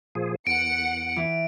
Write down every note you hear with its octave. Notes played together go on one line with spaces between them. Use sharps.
A#2 F3 G#4
E2 F#5 C#7 D7
E3